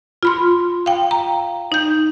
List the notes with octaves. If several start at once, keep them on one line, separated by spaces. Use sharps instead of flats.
F4 B5 C6
F5 G5
A#5
D#4 G6